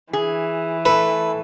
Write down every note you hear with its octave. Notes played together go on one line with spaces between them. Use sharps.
E3 G#4
A3 A4 B4